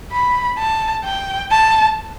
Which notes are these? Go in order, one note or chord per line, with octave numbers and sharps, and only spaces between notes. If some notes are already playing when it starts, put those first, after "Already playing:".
B5
A5
G5
A5